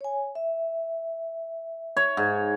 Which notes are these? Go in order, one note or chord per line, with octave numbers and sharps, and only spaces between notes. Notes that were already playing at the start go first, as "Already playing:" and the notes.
C#5 G#5
E5
C#5
G#2